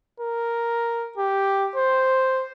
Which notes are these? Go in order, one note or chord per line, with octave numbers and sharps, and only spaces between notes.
A#4
G4
C5